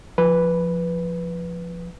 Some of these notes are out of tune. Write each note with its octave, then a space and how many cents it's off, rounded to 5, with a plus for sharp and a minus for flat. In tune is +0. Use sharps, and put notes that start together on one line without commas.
F3 +0 B4 +0